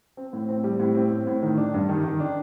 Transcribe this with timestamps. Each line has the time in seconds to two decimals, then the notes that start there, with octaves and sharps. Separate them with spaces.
0.17 C4
0.33 A2
0.49 C4
0.64 G3
0.79 A2
0.95 C4
1.11 A2
1.27 A2
1.43 D#3
1.58 D4
1.74 G2
1.89 D#3
2.04 D#3
2.20 D4